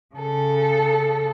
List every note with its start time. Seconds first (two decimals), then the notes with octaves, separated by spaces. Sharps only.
0.15 C#3 A4